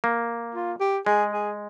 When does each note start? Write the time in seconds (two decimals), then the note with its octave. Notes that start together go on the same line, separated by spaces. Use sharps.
0.04 A#3
0.55 F4
0.80 G4
1.06 G#3 G#4
1.33 G#4